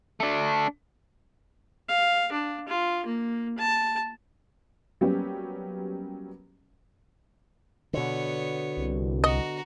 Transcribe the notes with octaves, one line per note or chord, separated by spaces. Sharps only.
A3 D4
F5
D4
F4
A#3
A5
F#3 G3 A#3 B3 C#4 G4
B2 D3 B3 C#5
C2
F#4 D#5 A#5